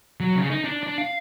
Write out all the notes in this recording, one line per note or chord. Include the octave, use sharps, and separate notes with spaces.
F#3
C#3
D#4
D4
D4
F5